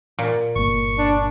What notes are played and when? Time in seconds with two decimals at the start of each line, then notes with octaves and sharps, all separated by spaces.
0.19 A#2
0.56 G1 A#3 C#6
0.98 D4